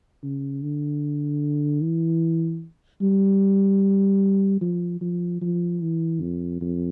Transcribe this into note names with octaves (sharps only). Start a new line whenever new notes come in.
C#3
D3
E3
G3
F3
F3
F3
E3
F2
F2